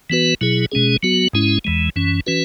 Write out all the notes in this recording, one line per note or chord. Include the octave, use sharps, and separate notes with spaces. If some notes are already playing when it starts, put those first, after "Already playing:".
E3 B3 F#4 B4
B2 F#3 E4 G#4
B2 G#3 C#4 G#4
F#3 B3 F#4
G#2 G#3 C#4 E4
E2 E3 G#3
F#2 E3 C#4
E3 C#4 F#4 B4